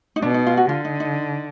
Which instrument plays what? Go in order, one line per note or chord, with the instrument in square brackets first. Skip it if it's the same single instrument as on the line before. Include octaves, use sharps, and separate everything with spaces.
[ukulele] D#4
[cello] B2 [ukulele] D4
[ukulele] D#4
F4
F#4
[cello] D3 [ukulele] F4
[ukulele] D#4
D#4